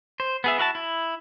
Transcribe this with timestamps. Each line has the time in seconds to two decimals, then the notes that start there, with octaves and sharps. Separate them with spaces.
0.20 C5
0.44 B3 G#4 E5
0.58 E4 F#4 F5 A5
0.75 E4